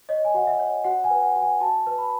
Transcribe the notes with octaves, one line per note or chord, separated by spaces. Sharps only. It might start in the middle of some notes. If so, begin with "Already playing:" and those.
C#5 D#5
G#5
F#4 F#5
E5
C#5
F#4 F#5
G#5
B4
F#5
F#4
G#5
F#4 A5
B4
B5